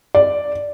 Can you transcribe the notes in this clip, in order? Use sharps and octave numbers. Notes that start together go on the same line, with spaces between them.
D5